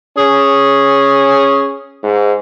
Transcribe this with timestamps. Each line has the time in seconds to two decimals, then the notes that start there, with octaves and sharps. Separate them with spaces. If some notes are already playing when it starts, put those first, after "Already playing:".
0.17 C#4 G#4
2.04 G#2